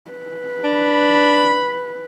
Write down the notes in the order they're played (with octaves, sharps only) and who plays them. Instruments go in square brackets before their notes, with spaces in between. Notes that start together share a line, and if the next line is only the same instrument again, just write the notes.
[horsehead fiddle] B4
[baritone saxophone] D4 [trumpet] B5